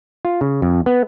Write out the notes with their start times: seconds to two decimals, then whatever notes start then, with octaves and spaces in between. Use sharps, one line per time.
0.25 F4
0.41 C#3
0.62 F2
0.86 B3